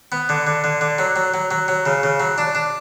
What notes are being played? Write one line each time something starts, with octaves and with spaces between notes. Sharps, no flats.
B3
D3
D3
D3
D3
F#3
F#3
F#3
F#3
F#3
C#3
C#3
F#3
D4
D4